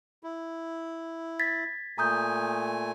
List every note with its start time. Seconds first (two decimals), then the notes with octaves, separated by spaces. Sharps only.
0.23 E4
1.40 G#6 A6 B6
1.98 A#2 A3 G#5 A#5 D#6 G6